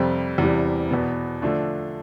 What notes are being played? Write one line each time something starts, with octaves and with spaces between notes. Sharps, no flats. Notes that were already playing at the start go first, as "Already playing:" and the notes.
Already playing: F2 C3 G3 C4
E2 C3 E3 G3
E2 B2 B3
D3 F3 A3 D4